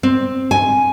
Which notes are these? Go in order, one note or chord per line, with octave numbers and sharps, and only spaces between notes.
C4
G#5